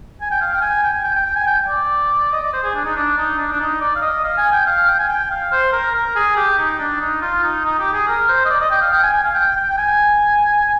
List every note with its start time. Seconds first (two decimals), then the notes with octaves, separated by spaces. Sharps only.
0.21 G#5
0.31 G5
0.41 F5
0.54 G5
0.61 G#5
0.83 G5
0.94 G#5
1.04 G5
1.15 G5
1.25 G5
1.36 G#5
1.47 G5
1.68 D5
2.32 D#5
2.43 D5
2.53 C5
2.64 G#4
2.75 D4
2.85 D#4
2.96 D4
3.17 D#4
3.38 D4
3.52 D4
3.60 D#4
3.81 D5
3.95 F5
4.02 D#5
4.24 F5
4.37 G#5
4.52 G5
4.66 F5
4.87 G5
4.99 G#5
5.09 G5
5.30 F5
5.52 C5
5.72 A#4
5.94 A#4
6.16 G#4
6.37 G4
6.58 D#4
6.79 D4
7.01 D#4
7.22 F4
7.43 D#4
7.64 D#4
7.79 G4
7.93 G#4
8.07 A#4
8.28 C5
8.45 D#5
8.50 D5
8.61 D#5
8.71 G5
8.81 F5
8.93 G5
9.03 G#5
9.13 G#5
9.25 F5
9.34 G5
9.56 G5
9.70 G5
9.78 G#5